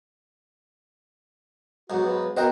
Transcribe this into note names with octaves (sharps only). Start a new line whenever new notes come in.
B1 G#2 F#4
B4
B3 F#4 A#4 C5 D#5 G5